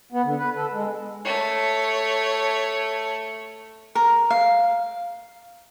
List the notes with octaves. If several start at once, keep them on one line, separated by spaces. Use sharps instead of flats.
B3
D3
B4
A4
G#3
A3 C#5
A#4
F5